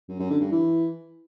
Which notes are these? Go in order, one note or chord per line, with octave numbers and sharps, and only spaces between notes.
F#2
F#2
D3
G2
E3